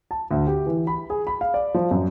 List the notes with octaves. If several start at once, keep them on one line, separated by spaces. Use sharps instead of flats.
A5
D2
G4
E3
B5
G#4
B5
F5
D5
F3
F#2